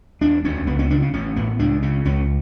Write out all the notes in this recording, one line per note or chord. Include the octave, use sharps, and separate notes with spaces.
E1 D4
D2 C#4
C#2 B3
C#4
C#3 D4
C#4
A1 C#4
A2 B3
C#2 D4
C#3 C#4
C#2 C#4